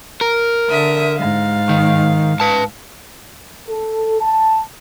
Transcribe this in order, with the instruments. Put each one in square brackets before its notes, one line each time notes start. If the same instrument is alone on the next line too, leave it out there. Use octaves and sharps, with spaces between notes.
[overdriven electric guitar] A#4
[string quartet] D3 E5 D#6
G#2 F5
[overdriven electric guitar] D#3
B4 A5
[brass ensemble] A4
A5